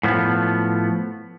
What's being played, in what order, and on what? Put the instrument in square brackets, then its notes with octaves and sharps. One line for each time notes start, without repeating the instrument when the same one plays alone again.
[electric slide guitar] A2 F3 B3